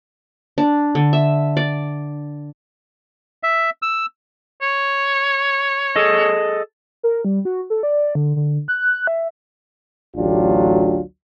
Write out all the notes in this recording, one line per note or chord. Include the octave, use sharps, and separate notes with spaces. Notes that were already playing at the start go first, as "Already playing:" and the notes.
D4
D3
E5
D5
E5
E6
C#5
G#4 A4 D#5
A#4
G3
F#4
A4
D5
D3
D3
F#6
E5
A1 D2 F#3 D4 F4 G4